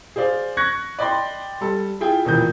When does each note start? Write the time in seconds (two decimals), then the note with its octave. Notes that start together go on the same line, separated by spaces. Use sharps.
0.16 G#4 C5 D5 F5
0.57 C#6 F#6 G#6 A#6 C#7
0.99 D5 D#5 G5 B5 C6
1.61 G3 A4
2.01 E4 F4 G#4 G5
2.25 E1 D#2 A#2 E3 G6